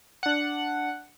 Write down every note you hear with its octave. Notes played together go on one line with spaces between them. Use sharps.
D4 F#5